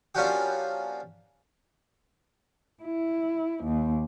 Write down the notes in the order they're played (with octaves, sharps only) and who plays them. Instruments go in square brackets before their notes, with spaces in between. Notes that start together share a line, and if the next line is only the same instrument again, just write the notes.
[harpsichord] F3 A#3 C#4 D4 F#4 G4
[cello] E4
D#2